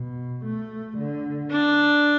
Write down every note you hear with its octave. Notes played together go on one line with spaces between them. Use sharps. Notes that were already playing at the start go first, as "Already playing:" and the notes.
Already playing: B2
A3
D3
D4